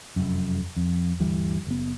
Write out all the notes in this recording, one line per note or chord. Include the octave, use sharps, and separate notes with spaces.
F1 F#2
F2
G1 D2 E3 G3
F#1 B3